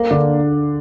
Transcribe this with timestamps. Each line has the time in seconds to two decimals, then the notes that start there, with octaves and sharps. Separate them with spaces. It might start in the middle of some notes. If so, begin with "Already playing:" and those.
Already playing: A#3
0.11 D3 D4